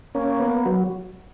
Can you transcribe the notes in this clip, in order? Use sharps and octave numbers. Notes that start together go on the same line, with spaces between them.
A#3 C#4
B3
F#3